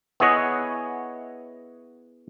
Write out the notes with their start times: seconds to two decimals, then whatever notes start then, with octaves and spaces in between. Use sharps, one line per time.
0.20 B3 E4 G#4 C#5 D#5 F#5